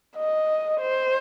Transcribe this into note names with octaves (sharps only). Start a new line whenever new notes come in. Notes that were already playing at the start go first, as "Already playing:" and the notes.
D#5
C5